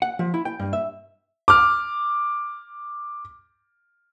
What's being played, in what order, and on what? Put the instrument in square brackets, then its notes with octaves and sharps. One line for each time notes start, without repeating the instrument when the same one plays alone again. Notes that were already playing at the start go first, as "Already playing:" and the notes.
[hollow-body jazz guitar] F#5
F3
E4
G5
G2
E5
[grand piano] D6 F6